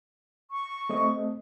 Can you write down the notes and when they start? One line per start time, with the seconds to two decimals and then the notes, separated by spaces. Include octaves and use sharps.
0.51 C#6
0.90 A3 C4 D#5